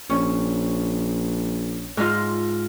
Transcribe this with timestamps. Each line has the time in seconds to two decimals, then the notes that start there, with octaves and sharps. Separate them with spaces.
0.10 A#1 C#4
1.97 G#2 D#4 F4